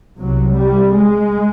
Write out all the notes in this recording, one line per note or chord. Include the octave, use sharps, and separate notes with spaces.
C2 C3 F#3
G3
G#3